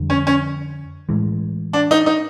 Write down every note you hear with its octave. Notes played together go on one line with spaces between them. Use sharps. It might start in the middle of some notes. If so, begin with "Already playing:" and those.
Already playing: F2 D3 G3
C#4
C#4
A2 E3 G#3
D4
D#4
D#4